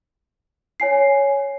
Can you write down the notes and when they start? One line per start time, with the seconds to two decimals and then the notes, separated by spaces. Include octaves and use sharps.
0.80 C#5 G#5 C7